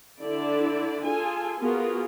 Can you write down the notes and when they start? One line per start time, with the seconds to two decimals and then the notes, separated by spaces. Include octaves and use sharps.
0.20 D3 E4 D5
1.05 F4 G#4 A4 G#5
1.60 B3 F4 F#4 G#4 A#4